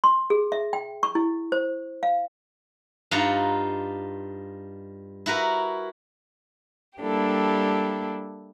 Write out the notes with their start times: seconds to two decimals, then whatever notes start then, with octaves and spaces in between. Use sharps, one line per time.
0.04 C6
0.30 G#4
0.52 E5
0.73 G5
1.03 C#6
1.15 E4
1.52 C5
2.03 F5
3.11 G2 D#4 F4 F#5 A#5
5.26 E4 F#4 A#4 B4
7.00 G3 A#3 D4 E4 G4 A4